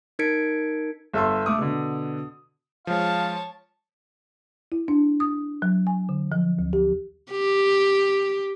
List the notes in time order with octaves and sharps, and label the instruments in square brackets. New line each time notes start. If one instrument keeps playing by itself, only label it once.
[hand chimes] D#4 A#4 G#6 B6 C#7 D7
[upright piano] G1 A4 E5 C6
A3 D6 D#6
B2 D3
[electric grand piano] F3 G#3 [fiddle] C#5 A5 [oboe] F5
[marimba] E4
D4
D#6
F#3
G#5
D3
F3
D2
G4
[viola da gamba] G4